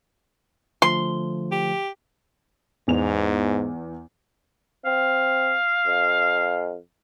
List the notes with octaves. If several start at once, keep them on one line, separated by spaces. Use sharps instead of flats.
D3 F3 A3 C6
G4
E2 G#2 F7
C4 F5
F2